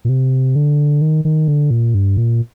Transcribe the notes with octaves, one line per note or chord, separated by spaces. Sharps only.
A#2
C3
D3
D#3
D#3
D3
A#2
G2
A#2